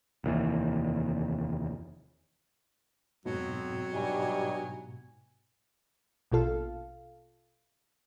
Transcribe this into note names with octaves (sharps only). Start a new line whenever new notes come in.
F1 D#2 E3
F2 G#2 B2 F#3
G2 G3 D#4 G#5
A#1 B2 F4 A4 F5